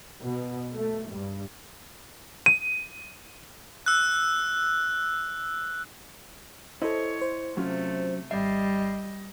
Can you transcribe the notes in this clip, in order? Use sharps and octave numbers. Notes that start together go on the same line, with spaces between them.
B2
A3
G2
D#7
E6 F#6
E4 A4 C5 C#5 D#5
C5
C3 F#3 A3 C#4 F4
G#1 G3 D#5 E5 C7